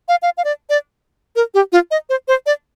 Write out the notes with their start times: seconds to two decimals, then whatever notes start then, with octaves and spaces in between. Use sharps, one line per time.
0.08 F5
0.22 F5
0.37 F5
0.45 D5
0.70 D5
1.36 A#4
1.54 G4
1.72 F4
1.91 D#5
2.09 C5
2.28 C5
2.46 D5